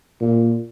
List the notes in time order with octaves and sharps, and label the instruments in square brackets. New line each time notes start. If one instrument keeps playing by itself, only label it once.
[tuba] A#2